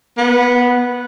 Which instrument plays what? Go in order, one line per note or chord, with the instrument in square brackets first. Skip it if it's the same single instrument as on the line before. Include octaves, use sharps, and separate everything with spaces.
[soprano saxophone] B3